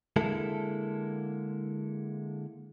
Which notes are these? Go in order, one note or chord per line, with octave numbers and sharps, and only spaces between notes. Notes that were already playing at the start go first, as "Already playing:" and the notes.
D3 G#3 A#3 E4 A4